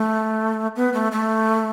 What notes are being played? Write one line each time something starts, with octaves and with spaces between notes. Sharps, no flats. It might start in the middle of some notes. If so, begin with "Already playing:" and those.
Already playing: A3
B3
A3
A3